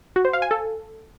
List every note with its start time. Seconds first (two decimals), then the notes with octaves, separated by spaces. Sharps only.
0.16 F#4
0.25 C5
0.33 F5
0.42 G#5
0.51 A4